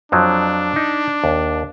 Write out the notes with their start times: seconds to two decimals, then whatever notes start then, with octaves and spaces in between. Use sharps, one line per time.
0.12 F2 F3 F#3 D4
0.76 D#4
1.24 D#2